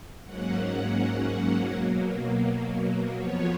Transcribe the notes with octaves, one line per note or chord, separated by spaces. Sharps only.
G#2 F#3 A#3 C#4 F#5
B2 F#3 A#3
F2 F3 B3 C#5